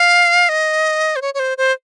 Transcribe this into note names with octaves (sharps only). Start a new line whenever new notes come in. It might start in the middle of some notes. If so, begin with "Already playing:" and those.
Already playing: F5
D#5
C5
C#5
C#5
C5
C5